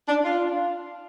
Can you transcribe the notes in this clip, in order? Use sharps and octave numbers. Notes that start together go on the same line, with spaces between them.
D4
F4